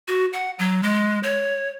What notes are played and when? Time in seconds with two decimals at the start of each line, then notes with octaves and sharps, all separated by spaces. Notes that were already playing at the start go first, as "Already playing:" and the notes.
0.08 F#4
0.33 F#5
0.59 F#3
0.83 G#3
1.23 C#5